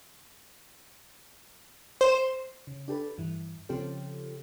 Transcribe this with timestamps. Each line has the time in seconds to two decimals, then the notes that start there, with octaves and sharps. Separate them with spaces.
2.01 C5
2.67 C#3
2.88 D4 G4 A4 B4
3.18 G2 E3
3.69 C#3 F3 C4 F4 G4 A4